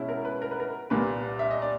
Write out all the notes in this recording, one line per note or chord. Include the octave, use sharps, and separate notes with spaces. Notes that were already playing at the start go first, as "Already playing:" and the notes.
Already playing: B2 G#3 C#4 E4
A#4
B4
A#4
B4
A#4
C2 A#2 G3 A#3 B4
E5
D#5
D5